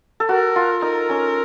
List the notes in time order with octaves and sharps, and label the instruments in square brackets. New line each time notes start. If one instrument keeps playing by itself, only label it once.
[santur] A4
[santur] F#4 [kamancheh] A#4
[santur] F4
[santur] D#4 [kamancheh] A#4
[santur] C#4